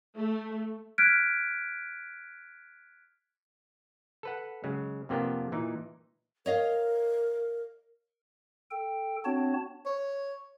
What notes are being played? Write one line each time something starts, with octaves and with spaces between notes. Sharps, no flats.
A3
F6 F#6 G#6 B6 D7
A4 B4 F#5
C#3 F#3 G#3
F2 C3 A#3 B3 D4 G5
A#2 E3 D#4
A#4 C#5 D#5 F5
A4 G5
B3 C4 D4 F#4 C#5 A5
C#5